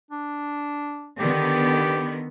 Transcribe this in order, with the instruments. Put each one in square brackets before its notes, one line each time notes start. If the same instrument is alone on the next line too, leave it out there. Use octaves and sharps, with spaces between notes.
[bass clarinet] D4
[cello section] D3 D#3 B3 [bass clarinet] G4